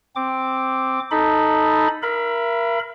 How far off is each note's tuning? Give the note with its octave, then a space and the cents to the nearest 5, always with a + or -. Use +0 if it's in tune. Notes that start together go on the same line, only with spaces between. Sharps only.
C4 +0 D6 +0
D#4 +0 A4 +0 B5 +0
A#4 +15 E5 +40 B5 +0